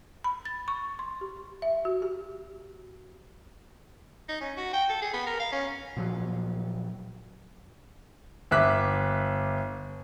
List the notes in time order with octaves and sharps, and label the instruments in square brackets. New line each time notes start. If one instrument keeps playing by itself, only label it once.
[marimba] B5
A6
C#6
C6
G4
E5
F#4
G4
[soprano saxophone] D#4
C#4
F#4
G5
A4
G#4
B3
A#4
F5
C#4
[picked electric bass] A#2 F3 F#3
[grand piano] G1 E5 D6 F#6 B6